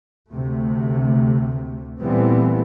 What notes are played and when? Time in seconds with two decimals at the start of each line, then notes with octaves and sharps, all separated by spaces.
0.29 D2 C3 A3
2.02 A#2 E3 G3 A3 B3 C4